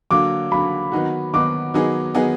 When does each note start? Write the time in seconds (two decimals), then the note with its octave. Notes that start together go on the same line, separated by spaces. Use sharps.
0.11 D3 F#3 A#3 D6
0.51 D3 F#3 A#3 B5
0.92 D#3 F#3 B3 D#4 F#4
1.33 D#3 F#3 B3 D#4 F#4 D6
1.74 D#3 F#3 B3 D#4 G#4
2.14 D#3 F#3 B3 D#4 G#4